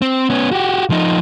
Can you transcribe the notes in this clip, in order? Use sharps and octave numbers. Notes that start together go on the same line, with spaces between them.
C4
B3 C#4
F#4 G4
F3 D#4